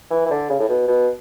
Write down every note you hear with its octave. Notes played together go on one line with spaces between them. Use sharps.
E3
E3
D3
C#3
A2
B2
B2